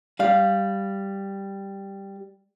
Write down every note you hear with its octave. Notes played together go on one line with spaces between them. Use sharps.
G3 F5